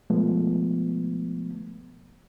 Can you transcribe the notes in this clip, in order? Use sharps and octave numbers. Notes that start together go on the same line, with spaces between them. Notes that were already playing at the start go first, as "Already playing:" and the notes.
B2 F3 G#3 A3 B3